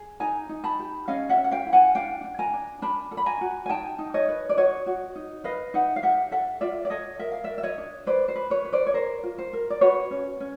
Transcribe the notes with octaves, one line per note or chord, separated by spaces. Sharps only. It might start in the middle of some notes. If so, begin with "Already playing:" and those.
Already playing: G#4
D#4 G#5 A#5
D#4
A5 B5
G4
C#4 D#5 F5
E5 F#5
C#4
F#5
F5 G5
E4
F#5 G#5
D4 F5 G5
D4
G#5 A#5
D4
D4 A5 B5
A4
B5
G#5 A#5
F#4
G#5
D#4 G5 A5
D#4
C#5 D#5
B4
D5
F#4 C#5 D#5
F#4
D#4
B4 D#5 F5
D#4 E5 F#5
F5
G4 E5 F#5
A4 E5 F#5
F4 D5 E5
D5
A4 C#5 D#5
A#4 E5
F5
D5 E5
A#4
E5
C#5 D#5
D4
B4 C5 D5
C5
B4
B4 C#5
B4
C5 D5
C#5
A#4 C5
F4
C5
A#4
D5
F#4 B4 C#5
C#4
C#4